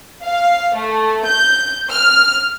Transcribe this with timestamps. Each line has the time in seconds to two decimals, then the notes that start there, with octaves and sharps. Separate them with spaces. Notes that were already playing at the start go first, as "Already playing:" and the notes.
0.24 F5
0.77 A3
1.26 G6
1.90 F6